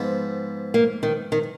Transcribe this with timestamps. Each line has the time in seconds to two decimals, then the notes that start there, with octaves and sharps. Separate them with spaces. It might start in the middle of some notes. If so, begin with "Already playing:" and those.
Already playing: G#2 F3 B3
0.74 A#3
1.03 D#3
1.32 D#3